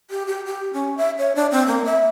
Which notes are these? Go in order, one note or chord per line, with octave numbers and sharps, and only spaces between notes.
G4
G4
G4
C#4
E5
C#5
D4
C4
A#3
E5